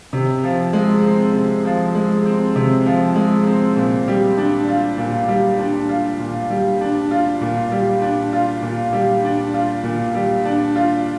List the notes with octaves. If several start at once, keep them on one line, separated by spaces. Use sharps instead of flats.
C3
F3
G#3
C4
C3
F3
G#3
C4
C3
F3
G#3
C4
A#2
G3
D4
F4
A#2
G3
D4
F4
A#2
G3
D4
F4
A#2
G3
D4
F4
A#2
G3
D4
F4
A#2
G3
D4
F4